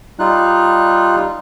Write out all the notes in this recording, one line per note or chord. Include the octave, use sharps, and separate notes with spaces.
G3 D#4 F4 F#6